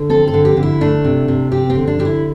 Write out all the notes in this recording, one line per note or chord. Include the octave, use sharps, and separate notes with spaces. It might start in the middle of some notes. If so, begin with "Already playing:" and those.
Already playing: D3
C4 A4
A4
D3
G4
D3
E4
A3 D4
C3
C3
C4 G4
C4
D3
D4
D3 G4
E4